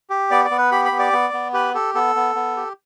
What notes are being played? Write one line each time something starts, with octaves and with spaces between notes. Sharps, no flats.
G4
B3 D5
D5
B3
B4
G4 B5
B5
B3
D5
B3
B3
G4 B4
G4 A4
B3 A4
B3
B3
G4